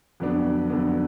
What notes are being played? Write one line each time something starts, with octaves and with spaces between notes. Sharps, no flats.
F2 D3 F#3 B3 D4
F2 D3 F#3 B3 D4